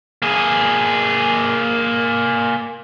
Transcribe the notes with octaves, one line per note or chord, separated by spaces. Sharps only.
A#3 G#4